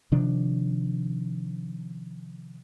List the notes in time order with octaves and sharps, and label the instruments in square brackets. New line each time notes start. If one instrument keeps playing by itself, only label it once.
[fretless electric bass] C3 D#3 F3 D4